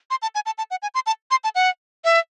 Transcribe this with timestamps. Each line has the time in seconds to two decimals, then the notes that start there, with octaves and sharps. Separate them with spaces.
0.11 C6
0.22 A5
0.35 G#5
0.46 A5
0.58 A5
0.71 F#5
0.82 G#5
0.95 C6
1.06 A5
1.31 C6
1.44 A5
1.55 F#5
2.04 E5